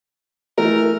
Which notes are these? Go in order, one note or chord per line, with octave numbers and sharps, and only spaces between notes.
E3 A3 A#4